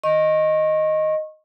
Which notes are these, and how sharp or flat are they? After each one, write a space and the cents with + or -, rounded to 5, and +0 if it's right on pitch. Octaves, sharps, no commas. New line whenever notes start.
D#5 +0 C#6 -35